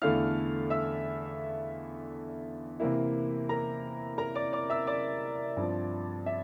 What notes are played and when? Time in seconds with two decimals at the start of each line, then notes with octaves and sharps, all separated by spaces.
0.02 E2 D3 A3 E4 F5 F6
0.70 E5 E6
2.80 C3 E3 A#3 E4
3.49 A#4 A#5
4.18 A#4 A#5
4.35 D5 D6
4.53 D5 D6
4.70 E5 E6
4.87 D5 D6
5.57 G2 F3 C4
6.26 E5